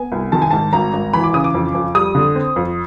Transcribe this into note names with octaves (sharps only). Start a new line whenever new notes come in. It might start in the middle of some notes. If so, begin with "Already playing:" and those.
Already playing: B3 G#5
C2
D#3 A5
G#5
G#2 A5
G#1 A#5
G#1
E3 B5
D6
C#3 D#6
D6
F2
F2
G3 D#6
D3
C4
F2